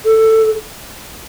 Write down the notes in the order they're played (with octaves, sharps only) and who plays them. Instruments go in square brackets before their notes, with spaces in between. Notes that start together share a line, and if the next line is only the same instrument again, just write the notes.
[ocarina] A4